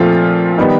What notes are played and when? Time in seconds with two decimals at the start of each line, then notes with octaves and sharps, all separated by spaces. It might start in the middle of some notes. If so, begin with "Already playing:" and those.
Already playing: A#2 F3 A3 C4 F4
0.58 D#3 G3 B3 D#4